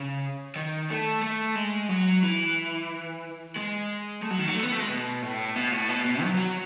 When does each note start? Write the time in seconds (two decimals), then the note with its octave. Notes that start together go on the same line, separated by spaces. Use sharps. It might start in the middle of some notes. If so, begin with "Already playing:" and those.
Already playing: C#3
0.56 D#3
0.90 A3
1.22 A3
1.55 G#3
1.89 F#3
2.23 E3
3.56 G#3
4.22 A3
4.30 F#3
4.39 D#3
4.47 F#3
4.55 A3
4.63 B3
4.72 A3
4.80 G#3
4.89 B2
5.22 A2
5.56 B2
5.72 A2
5.89 B2
6.05 B2
6.22 F#3
6.39 F#3